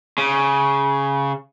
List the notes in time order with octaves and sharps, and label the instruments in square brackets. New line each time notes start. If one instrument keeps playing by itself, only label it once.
[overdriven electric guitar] C#3